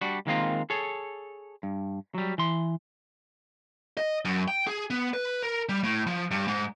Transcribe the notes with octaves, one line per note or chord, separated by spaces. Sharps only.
G3 D4 F#4
D#3 G#3 A#3 C4 F4
G#4 A4 C#5
G2
F#3 G3
E3 C6
D#5
F#2
G5
G#4
B3
B4
A#4
G3
A2
F3
G2
G#2